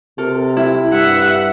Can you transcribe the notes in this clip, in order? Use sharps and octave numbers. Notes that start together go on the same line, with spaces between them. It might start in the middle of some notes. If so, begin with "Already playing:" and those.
C3 A4 A#4
E4
G2 E5 F#5